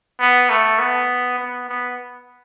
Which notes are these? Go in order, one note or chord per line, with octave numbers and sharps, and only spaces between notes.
B3
A3
B3
B3
B3